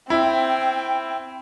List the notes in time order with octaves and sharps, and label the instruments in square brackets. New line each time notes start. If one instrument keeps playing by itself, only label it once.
[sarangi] C4 [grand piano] E4 [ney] G5